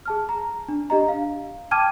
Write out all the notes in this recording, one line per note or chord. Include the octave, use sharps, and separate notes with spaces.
G#4 A5 F6
A#5
D4
D4 G4 D#5 A#5
F5
G5 A5 D6 F6 G#6 D#7